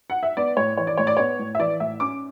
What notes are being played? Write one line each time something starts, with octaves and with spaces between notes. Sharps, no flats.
F#5
E5
B3 D5
A2 C#5
E3 C#5
D5
A2 C#5
D5
B3 C#5
A2
E5
E3 D5
A2 E5
C#4 D6